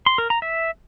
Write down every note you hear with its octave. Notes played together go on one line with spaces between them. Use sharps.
C6
A#4
A#5
E5